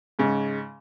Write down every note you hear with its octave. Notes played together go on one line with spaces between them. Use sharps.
G#2 C#3 G#3